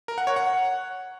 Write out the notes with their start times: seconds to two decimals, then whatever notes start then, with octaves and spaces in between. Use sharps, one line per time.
0.08 A#4
0.18 F#5
0.27 C#5
0.36 F#5